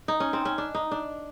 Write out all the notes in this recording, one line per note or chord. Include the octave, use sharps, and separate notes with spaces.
D#4
C#4
C4
C#4
D4
D#4
D4